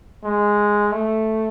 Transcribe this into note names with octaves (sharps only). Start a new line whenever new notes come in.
G#3
A3